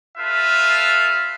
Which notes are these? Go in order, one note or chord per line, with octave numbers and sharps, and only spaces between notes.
F4 A4 B4 E5 F5